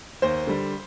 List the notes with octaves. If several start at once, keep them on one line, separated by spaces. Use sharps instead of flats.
D#2 C5
D3 G3